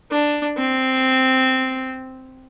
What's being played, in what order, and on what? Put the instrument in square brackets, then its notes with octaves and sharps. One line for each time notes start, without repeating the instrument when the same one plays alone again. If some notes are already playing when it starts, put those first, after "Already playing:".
[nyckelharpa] D4
C4